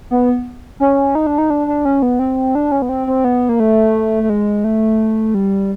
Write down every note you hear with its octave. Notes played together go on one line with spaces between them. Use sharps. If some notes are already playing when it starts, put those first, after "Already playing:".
B3
C#4
D#4
D4
D#4
D4
D4
C#4
B3
C4
D4
C#4
B3
C4
C4
B3
A#3
A3
A3
G#3
A3
G3